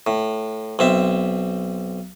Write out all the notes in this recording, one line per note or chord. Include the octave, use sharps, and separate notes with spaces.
A2
B1 C4 E5